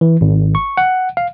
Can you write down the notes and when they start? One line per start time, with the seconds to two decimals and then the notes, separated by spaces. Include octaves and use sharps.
0.01 E3
0.21 G#1
0.55 C#6
0.77 F#5
1.17 F5